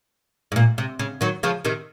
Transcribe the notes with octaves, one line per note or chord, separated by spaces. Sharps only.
G#2
A#2
C3
C#3
D#3 F#3
C#3 F3
C3 D#3